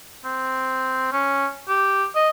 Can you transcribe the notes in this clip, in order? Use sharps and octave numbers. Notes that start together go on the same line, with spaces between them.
C4
C#4
G4
D#5